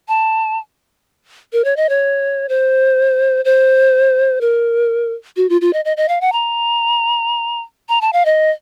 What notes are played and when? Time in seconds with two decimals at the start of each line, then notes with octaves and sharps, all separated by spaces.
0.08 A5
1.53 A#4
1.64 C#5
1.76 D#5
1.89 C#5
2.49 C5
3.45 C5
4.41 A#4
5.37 F#4
5.49 F4
5.61 F4
5.73 D#5
5.85 D#5
5.97 D#5
6.08 F5
6.21 F#5
6.32 A#5
7.89 A#5
8.01 A5
8.13 F5
8.25 D#5